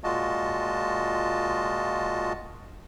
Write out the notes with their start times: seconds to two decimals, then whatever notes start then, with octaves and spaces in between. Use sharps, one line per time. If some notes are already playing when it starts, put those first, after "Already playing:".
0.04 A#2 G#3 F4 F#4 D#5 A5